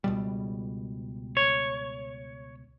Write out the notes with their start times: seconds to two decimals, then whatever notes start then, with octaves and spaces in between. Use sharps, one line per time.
0.04 C#2 B2 G3
1.37 C#5